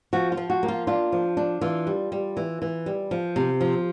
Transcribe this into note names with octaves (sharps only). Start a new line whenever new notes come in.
F3 F#4
F4
F3
F#4
A#3
F4
D4 F4
F3
D4
E3 F4
G3
G3
E3
E3
G3
F3
C3
F3